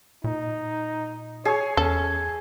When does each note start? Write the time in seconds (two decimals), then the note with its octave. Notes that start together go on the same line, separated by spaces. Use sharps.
0.24 A#2 D#4
1.45 G#4 C#5
1.77 E2 C#4 A4